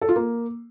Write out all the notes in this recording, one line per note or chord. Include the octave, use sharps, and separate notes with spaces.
A4
F4
A#3